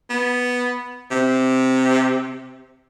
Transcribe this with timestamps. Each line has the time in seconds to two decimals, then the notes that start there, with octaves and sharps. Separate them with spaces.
0.10 B3
1.11 C3